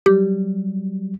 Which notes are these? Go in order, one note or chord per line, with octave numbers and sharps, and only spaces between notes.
F#3 G3 G4